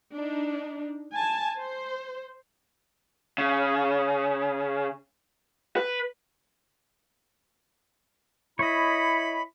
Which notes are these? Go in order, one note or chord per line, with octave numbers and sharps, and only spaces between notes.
D4 D#4
G#5 A5
C5
C#3
B4
E4 C#5 D#5 B5